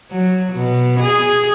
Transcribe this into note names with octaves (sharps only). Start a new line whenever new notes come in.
F#3
B2
G#4